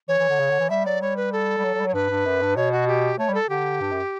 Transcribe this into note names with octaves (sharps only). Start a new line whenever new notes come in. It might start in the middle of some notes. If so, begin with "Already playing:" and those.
E3 C#5
E3
D3
C#3
D3
E3
G3 E5
F#3 D5
G3 C#5
B4
A4
G3
F#3
F#3
G3
F#3 C#5
G2 B4
G2
F#2
G2
B2 C#5
F#4
G4
A3 C#5
G3
A4
D3 G4
G2
F#2